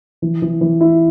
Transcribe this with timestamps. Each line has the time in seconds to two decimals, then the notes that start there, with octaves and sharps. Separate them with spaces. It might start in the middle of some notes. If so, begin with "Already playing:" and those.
0.22 E3
0.42 E3
0.61 E3
0.81 E4